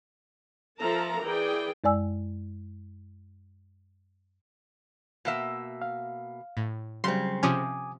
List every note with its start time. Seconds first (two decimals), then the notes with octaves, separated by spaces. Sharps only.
0.81 F3 A4 A#4 E5 A5 A#5
1.23 E3 G#4 D5 G5
1.84 F#2 G#3 D5 G#5 E6
5.25 B2 A#3 E5
5.82 F5
6.57 A2
7.04 C#3 F#3 G3 C4 C6
7.43 C3 F3 C#4 G#5 D6 D#6